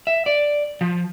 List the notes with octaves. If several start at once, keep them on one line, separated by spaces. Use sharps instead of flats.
E5
D5
F3